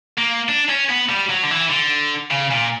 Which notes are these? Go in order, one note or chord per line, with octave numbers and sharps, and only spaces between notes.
A#3
D4
C#4
B3
G3
F#3
D3
E3
D3
C#3
A#2